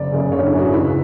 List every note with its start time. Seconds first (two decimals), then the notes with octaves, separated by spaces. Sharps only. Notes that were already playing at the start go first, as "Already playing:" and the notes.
Already playing: F#1 D5
0.11 F#2 C#3
0.32 F#1 C#5
0.39 D4
0.46 E4
0.52 F#2 C#3
0.59 F#4
0.72 C#2 E4